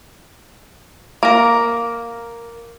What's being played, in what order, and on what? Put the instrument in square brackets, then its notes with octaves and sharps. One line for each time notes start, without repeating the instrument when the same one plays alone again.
[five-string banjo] A#3 A#4